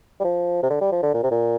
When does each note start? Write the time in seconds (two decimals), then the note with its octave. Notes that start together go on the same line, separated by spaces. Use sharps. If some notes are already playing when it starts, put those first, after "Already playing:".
0.20 G3
0.24 F3
0.63 C3
0.70 D3
0.81 G3
0.92 F3
1.03 D3
1.14 A#2
1.23 C3
1.31 A#2